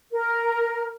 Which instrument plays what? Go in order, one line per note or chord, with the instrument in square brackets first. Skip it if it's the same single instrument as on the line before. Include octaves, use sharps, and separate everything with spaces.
[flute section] A#4